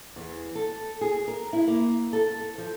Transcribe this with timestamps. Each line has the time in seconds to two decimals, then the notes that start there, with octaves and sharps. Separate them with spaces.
0.16 E2
0.55 A4
1.01 G#4
1.28 A#4
1.53 E4
1.68 A#3
2.13 A4
2.58 F3